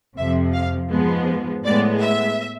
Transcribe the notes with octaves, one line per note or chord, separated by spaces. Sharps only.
F2 C3 F3 E5
F5
G#2 F3 G#3 B3
A2 G#3 B3 D5
E5